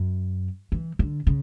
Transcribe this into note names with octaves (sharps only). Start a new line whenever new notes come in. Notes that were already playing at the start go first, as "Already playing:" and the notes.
Already playing: F#2
E3
D3
C#3